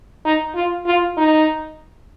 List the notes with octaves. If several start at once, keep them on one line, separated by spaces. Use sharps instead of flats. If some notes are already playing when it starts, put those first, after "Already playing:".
D#4
F4
F4
D#4